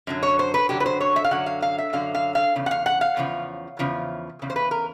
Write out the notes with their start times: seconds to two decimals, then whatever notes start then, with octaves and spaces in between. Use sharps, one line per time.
0.07 F#2 D3 F#3
0.23 C#5
0.39 C5
0.54 B4
0.69 F#2 D3 F#3 G4
0.80 B4
0.86 C5
1.01 C#5
1.16 E5
1.24 F5
1.31 F#2 D3 F#3 F#5
1.46 F5
1.62 F5
1.78 E5
1.93 F#2 D3 F#3 F5
2.15 F5
2.35 F5
2.56 E2 C#3
2.66 F#5
2.71 F5
2.86 F#5
3.01 F5
3.17 E2 C#3 F3
3.79 E2 C#3 F3
4.42 E2 C#3
4.50 C5
4.56 B4
4.71 A#4